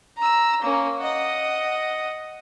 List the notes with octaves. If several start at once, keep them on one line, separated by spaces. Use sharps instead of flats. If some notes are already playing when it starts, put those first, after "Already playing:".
A#5 E6
A#3 C#4
D#5 F#5